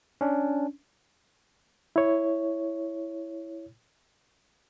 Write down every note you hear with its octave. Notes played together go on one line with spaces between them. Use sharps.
C#4 D4
E4 C#5